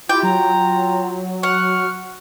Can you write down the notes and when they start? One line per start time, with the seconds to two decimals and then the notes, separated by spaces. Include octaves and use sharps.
0.09 E4 F4 G4 G5 D6
0.23 F#3 A#5
1.43 F#5 C#6 F6